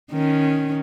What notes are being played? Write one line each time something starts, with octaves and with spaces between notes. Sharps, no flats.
D#3 C#4